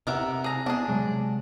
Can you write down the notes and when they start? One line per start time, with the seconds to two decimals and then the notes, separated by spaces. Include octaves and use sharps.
0.07 C3 B3 A#4 E5
0.44 G#4 A#5
0.66 B3 D4 G#4
0.88 C3 F#3 G#3